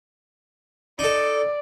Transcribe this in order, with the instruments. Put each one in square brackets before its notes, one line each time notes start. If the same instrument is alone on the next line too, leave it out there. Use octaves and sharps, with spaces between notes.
[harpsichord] D#4 A4 [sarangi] D5